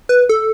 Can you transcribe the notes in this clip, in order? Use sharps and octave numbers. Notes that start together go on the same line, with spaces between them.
B4
A4